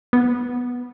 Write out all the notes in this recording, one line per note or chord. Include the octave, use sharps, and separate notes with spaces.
B3